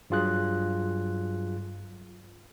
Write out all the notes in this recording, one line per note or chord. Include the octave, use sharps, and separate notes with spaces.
G2 F#3 F4 G#4 F#6